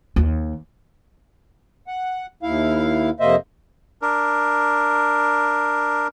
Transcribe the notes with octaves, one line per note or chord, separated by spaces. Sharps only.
D#2
F#5
D#2 E4 F5
F2 C3 A#3 C5 D#5 E5
D4 A#4